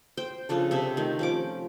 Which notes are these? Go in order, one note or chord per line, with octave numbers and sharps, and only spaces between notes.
C5 G5
C#3 F3 D4 A4
C3 E5
D#3 A3
F3 C#4 D6